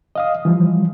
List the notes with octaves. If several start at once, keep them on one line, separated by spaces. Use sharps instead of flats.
D#5 F5 D#6
E3 F3 G3